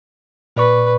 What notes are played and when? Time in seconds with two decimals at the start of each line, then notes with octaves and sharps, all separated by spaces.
0.56 A#2 B4 D5 C#6